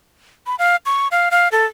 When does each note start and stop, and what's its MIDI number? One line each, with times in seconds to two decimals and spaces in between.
0.47 0.55 83
0.59 0.76 77
0.86 1.08 85
1.11 1.29 77
1.31 1.48 77
1.52 1.65 69